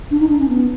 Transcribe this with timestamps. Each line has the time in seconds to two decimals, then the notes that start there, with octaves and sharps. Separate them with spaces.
0.11 D4
0.20 D#4
0.29 D4
0.39 C#4
0.48 B3